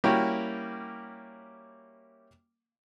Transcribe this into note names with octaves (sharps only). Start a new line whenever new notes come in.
G3 A#3 C#4 E4 F#4 G4